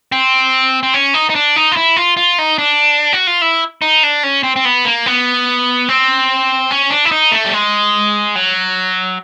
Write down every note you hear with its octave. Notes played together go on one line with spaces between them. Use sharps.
C4
C4
C#4
D#4
D#4
D4
D#4
F4
E4
F4
F4
D#4
D4
F#4
F4
E4
D#4
D4
C#4
C4
C4
B3
A#3
B3
C4
C#4
D4
E4
D#4
A3
G3
G#3
F#3